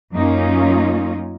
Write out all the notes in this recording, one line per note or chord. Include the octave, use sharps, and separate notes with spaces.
F#2 A#3 C#4 D#4 F4